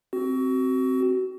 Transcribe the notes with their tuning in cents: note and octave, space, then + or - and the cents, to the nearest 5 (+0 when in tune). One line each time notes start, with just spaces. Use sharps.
C4 +0 F#4 +25